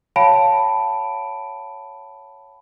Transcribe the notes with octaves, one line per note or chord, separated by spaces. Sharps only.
C#5 F5 G5 A5 B5 D7